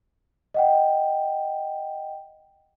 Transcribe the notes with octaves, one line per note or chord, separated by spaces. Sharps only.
D#5 F#5 G5